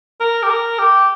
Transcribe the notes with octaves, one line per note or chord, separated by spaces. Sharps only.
A#4
G4
A#4
G4